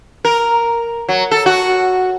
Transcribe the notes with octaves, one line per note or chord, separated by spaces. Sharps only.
A#4
F#3
A4
F#4